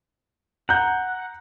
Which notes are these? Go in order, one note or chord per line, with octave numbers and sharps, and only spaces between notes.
F#5 A#5 G6